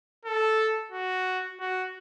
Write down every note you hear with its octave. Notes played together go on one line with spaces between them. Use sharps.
A4
F#4
F#4